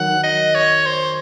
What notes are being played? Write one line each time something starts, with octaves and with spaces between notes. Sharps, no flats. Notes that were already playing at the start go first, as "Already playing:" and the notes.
Already playing: D#3 F#3 F#5
D#5
C#5
C5